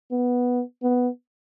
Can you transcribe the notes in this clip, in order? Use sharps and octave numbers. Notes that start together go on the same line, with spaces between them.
B3
B3